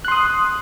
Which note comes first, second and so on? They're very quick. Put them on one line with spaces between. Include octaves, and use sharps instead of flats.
F#6 C6 D#6